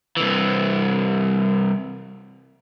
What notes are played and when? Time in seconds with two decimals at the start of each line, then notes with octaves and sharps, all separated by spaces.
0.17 C2 E3